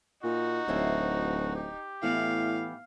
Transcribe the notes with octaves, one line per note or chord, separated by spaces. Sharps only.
A#2 D#4 F#4
D1 C5 C#5 E5
G4
A2 E3 B3 E4 F5